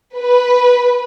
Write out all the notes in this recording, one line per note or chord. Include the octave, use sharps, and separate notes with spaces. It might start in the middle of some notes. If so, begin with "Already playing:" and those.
B4